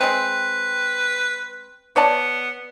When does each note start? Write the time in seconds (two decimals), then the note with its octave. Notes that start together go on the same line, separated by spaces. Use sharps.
0.01 G#3 C4 B4
1.96 B3 C#5 D5 A5